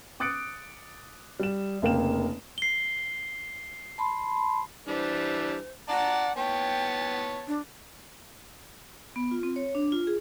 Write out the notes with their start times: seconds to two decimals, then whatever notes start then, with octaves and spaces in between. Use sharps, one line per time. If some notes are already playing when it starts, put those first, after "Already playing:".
0.20 D6 D#6 F#6 A6 C#7 D7
1.39 G3 E7
1.82 F1 C#3 A#3 F5 G5 E7
2.58 C7 G7
3.98 A5 B5 C6
4.88 E3 G3 D4 C5
5.89 D5 F#5 A5 A#5
6.37 B3 C#5 G5 A5
7.47 D4
9.16 B3
9.31 F4
9.43 C4
9.56 C#5
9.75 D4
9.92 F4
10.07 G#4